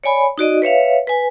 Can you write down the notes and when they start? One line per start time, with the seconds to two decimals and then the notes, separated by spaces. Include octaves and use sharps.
0.04 C#5 D5 G#5 B5
0.38 D#4 F#4 D5 D#5
0.62 B4 C#5 E5 F5
1.07 B4 G#5